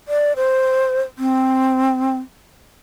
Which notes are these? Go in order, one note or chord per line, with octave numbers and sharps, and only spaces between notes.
D5
C5
C4